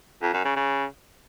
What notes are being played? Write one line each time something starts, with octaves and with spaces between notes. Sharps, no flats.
F2
F#2
C#3
C#3